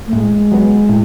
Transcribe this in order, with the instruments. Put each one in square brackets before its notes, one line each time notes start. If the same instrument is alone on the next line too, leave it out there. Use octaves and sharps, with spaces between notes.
[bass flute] A3
[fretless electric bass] A2 [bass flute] G#3
[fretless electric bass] F#3 B3
A2